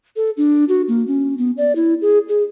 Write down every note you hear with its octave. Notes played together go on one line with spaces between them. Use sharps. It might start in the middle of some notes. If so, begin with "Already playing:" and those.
A4
D4
F#4
A#3
C#4
B3
D5
E4
G#4
G#4